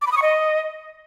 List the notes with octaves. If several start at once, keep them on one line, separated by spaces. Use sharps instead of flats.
D6
B5
D#6
C#6
D#5